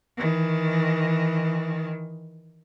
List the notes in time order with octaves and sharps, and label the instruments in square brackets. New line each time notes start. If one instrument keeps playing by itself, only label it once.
[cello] D#3 E3